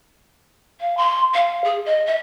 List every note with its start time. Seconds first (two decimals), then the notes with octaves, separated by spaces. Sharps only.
0.80 F5
0.97 C6
1.34 F5
1.64 G#4
1.85 D#5
2.05 E5